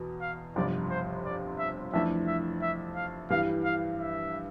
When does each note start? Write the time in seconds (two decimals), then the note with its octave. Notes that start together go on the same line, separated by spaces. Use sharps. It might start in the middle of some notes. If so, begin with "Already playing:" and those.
Already playing: E2 B2
0.21 F5
0.56 G1 F2 C3 D5
0.90 C5
1.25 D5
1.59 E5
1.93 F2 E3 A3 D4 E5
2.27 E5
2.62 E5
2.96 F5
3.30 G2 E3 G3 F5
3.64 F5
3.99 E5